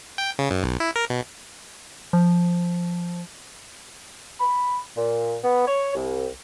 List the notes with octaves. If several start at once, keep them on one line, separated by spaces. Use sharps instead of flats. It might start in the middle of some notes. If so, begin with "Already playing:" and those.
G5
C#3
F#2
B1
E4
A#4
B2
F3
B5
A#2
B3
C#5
C2